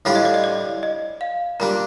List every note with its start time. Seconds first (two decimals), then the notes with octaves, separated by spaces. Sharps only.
0.05 A2 G3 D4 F4 F5
0.15 D#5
0.25 D5
0.34 D#5
0.44 D5
0.83 D#5
1.21 F5
1.60 A#2 G3 D4 A#5